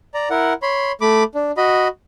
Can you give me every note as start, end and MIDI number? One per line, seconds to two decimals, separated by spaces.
0.14 0.29 74
0.14 0.29 82
0.30 0.53 64
0.30 0.53 70
0.30 0.53 78
0.62 0.92 73
0.62 0.92 83
0.62 0.92 84
1.01 1.23 57
1.01 1.23 83
1.01 1.23 86
1.35 1.51 62
1.57 1.88 66
1.57 1.88 75
1.57 1.88 83